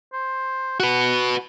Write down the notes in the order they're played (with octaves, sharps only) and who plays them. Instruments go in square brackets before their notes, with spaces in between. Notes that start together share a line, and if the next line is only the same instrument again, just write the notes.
[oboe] C5
[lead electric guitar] F#4 B4 [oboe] F#5